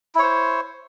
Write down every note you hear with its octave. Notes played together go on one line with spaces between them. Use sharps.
E4 C5 C#5